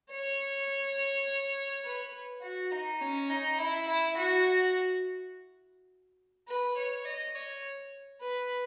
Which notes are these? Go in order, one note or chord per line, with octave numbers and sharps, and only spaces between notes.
C#5
B4
F#4
D#4
C#4
D#4
E4
E4
F#4
B4
C#5
D#5
C#5
B4